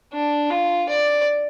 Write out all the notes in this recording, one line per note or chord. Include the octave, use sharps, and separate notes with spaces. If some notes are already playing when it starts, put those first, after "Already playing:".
D4
F4
D5